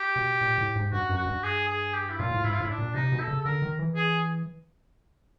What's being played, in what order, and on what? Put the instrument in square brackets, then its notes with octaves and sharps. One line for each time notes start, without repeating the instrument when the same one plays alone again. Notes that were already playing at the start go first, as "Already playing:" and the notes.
Already playing: [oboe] G4
[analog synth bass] B2
A#2
A2
G#2
[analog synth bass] G2 [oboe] F#4
[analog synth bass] F#2
[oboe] F#4
[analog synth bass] G2
[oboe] G#4
G#4
G4
E4
[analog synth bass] A#2 [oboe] F4
[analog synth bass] A2
[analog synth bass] G#2 [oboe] E4
[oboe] F4
[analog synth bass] A2 [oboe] E4
[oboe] D4
[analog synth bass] A#2
[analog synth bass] C3 [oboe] D#4
[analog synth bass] B2
[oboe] A4
[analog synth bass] C#3
[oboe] A4
[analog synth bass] D3 [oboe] A#4
[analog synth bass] D#3
E3
[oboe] G#4